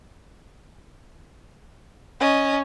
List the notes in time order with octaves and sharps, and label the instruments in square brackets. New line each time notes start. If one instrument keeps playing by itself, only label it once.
[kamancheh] C#4 [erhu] D#5